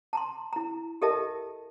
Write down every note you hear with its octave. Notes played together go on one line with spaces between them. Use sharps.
A5 A#5 C6
E4 A#5
G4 A4 A#4 D#5 E5 A5